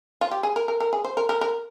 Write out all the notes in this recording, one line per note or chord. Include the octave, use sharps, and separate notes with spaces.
F4
G4
G#4
A#4
A#4
A#4
G#4
C5
A#4
A#4
A#4